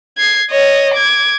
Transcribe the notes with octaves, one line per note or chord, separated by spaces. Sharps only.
G#6 C7
C#5 D#5
D6 G#6